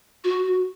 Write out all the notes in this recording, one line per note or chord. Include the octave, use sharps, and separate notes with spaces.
F#4